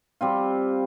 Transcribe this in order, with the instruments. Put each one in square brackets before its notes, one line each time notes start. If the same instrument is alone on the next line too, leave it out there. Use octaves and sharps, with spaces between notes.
[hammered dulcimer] G3 C4 F4